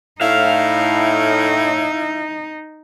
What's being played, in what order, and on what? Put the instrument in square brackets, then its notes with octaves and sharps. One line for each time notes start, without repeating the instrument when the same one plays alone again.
[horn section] A2 [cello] D#4 [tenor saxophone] E4 [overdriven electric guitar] F5